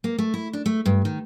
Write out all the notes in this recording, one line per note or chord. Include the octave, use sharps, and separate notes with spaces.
A#3
A3
E4
D4
A3
G2
D#3